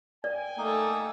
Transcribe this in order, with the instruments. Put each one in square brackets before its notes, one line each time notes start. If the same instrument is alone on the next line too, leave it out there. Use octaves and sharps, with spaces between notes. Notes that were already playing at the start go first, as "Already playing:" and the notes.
[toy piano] D5 [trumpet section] G5 G#5
[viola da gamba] A3 A4 [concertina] A#3 D#4